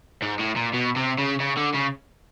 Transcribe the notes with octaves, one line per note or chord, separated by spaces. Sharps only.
G#2
A2
A#2
B2
C3
C#3
C#3
D3
C#3